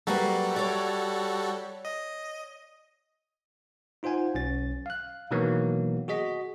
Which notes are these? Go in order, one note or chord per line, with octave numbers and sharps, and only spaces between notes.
F#3 G3 A#3 F#4 A4 B4
C#5 D5
D#5
D#4 F4 C5 F#5 G#5
B1 C#4 A6
F5 F#6
B2 D#3 E3 F#3 A#3 B3
F#4 G#4 D#5 B6